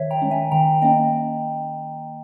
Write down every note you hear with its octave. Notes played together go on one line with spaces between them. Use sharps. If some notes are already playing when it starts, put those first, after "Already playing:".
Already playing: D#3 C#5 E5
G5 A#5
G#3 C#4
E5 G#5
D#3 G5 A#5
A#3 C#4 D#5 G5